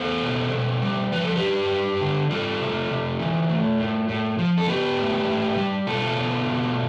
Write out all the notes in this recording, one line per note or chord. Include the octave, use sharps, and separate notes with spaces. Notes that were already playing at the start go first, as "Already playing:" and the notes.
Already playing: B3 A4 C5
B2
B2
G3
F3 B4
A4
G4 B4
G2
G2
D3
G3 F4 A4
C3
C3
E3
A3
A2
A2
F3
A4
B3 G4 B4
A2
A2
G3
B2 F4 A4
B3
B2